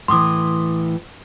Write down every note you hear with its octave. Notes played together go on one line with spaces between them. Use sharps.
A2 E3 C6 D6 D#6